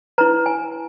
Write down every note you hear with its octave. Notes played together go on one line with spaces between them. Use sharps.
E4 B4 A#5
G#5